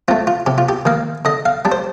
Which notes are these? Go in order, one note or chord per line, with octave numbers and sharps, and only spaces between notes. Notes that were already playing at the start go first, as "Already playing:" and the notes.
A3 C4 F4
F4
C3 G4
F4
G4
D#3 A#3 F5
D3 D#5
F5
G3 D4
C5